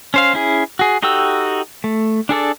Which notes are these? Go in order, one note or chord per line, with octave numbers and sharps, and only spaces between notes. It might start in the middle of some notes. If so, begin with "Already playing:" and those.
C#4 C5 F5
C#4 E4 G#4
F#4 G#4
D#4 F#4 G4 A4 E6
A3
D4 G#4 A4 D5